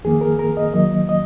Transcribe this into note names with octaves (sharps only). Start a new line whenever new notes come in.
F2 D#3 A#3 G#4
A#4
A#4
D#5
D#2 D#3 F#3 A#3 D#5
D#5